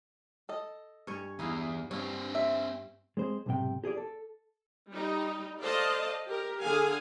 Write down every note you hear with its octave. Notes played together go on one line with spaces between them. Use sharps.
A4 D#5
G2 C#4 C#5
E2 D#4 E4 F5
G2 C4 C#5 F5
E5
G#3 C4 C5
B1 G#2 C3 G5
G4 G#4 C#5 D5
A4
G3 D#4
A4 C5 D5 D#5 F5 A5
G4 A#4
D3 G#4 F5 G#5